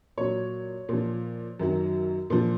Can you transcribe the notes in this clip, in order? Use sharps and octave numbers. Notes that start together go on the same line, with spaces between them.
A#2 F#3 C#5
A#2 F3
F#2 D#3 F#3
A#2 F3